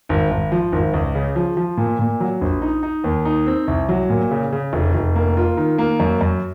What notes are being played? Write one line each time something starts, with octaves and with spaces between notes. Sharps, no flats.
G#1
G#1
F3
G#1
C#2
C#3
F3
F3
A#2
A#2
F#3
A#1
D#4
D#4
D#2
D#4
C4
C2
F#3
A#2
C#3
C#3
F1
F1
A#3
F4
D#3
A#3
F#2
F#2